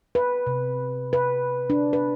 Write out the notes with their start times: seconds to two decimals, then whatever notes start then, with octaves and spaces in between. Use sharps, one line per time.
0.15 B4
0.47 C3
1.13 B4
1.70 D4
1.93 B4